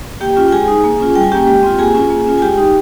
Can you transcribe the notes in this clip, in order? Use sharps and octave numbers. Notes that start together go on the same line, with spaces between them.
A#3 G4 G5
C#4 F4
G5
G#3 G#4 G#5
D#4
A#3
C#4 F4
G3 G5
G#5
A#3 C#4 G4 G5
G#3
C4 F4
A#3 G#4 G#5
C#4 F4
A#3
C#4 F4
G#5
G#3 G4 G5
D#4